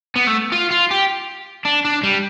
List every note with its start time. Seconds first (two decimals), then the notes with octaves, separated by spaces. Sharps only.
0.16 B3
0.27 A3
0.52 F4
0.71 F4
0.91 G4
1.65 D4
1.85 D4
2.03 G3